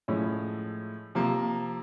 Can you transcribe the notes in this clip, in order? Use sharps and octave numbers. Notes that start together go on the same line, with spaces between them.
A2 F3 G#3 C#4 E4
C3 F3 A#3